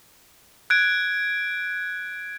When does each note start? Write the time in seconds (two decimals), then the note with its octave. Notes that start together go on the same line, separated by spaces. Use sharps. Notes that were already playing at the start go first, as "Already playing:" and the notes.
0.70 F#6 G#6 D7